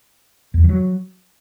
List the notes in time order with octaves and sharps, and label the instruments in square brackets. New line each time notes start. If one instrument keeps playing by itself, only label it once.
[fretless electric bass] E2
F2
E3
F#3